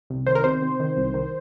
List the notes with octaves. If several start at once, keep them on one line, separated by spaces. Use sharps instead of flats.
C2
D#3 C5
A#4
C3 C5
C3
D#3
C2
D#3